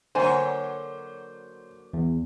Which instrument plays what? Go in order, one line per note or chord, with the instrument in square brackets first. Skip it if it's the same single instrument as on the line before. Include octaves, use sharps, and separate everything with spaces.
[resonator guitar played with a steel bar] D3 A#3 G#5 [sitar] F#3 C#5 [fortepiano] C5
[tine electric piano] E2